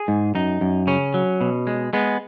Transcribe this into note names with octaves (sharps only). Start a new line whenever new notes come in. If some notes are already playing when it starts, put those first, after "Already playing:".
Already playing: G#4
G#2
F#2 D#4
F#2
C#3 C#4
F#3
B2
G#3
G#3 B3